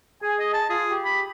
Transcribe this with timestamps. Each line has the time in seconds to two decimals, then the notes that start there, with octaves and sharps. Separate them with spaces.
0.22 G#4 G#5
0.39 D#5
0.53 A5
0.70 F4 G#4
0.90 G4
1.05 B5